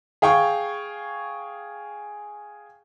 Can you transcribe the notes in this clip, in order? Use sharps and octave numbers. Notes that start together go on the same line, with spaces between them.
G#4 F5 G5 C#6